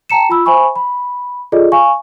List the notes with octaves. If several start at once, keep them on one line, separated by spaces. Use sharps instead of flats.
G5 A5 A#5 C#7 E7
F4 B5 E6
C5 E5 G#5 B5 C#6
B5
F4 G#4 A4 D5 D#5
F5 G#5 C#6